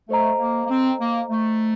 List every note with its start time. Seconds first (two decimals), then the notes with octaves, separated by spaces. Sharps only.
0.09 A3 A4 C5 D#5 A#5
0.39 A#3
0.64 A#3
0.69 C4
1.00 A#3
1.29 A3